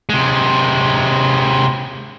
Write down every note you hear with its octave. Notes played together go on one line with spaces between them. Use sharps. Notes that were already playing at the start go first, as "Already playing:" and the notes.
C3 G#3